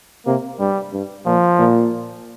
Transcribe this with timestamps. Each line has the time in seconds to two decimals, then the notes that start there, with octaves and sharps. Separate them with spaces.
0.26 C3 A#3
0.59 G2 G3
0.93 G2
1.25 A#2 F3
1.59 A#2